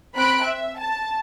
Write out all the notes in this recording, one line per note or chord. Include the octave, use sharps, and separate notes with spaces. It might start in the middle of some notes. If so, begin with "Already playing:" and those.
C4 B5 F#6 D7
E5
A5